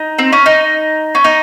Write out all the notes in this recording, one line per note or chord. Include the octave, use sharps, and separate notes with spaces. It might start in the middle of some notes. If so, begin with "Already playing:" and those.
Already playing: D#4
C4
C#4
D#4
C#4
D#4